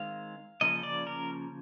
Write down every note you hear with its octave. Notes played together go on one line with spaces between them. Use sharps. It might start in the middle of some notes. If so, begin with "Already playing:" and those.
Already playing: D#3 G#3 C4 F5
C#3 F3 A#3 C#4 D#5
D5
A#4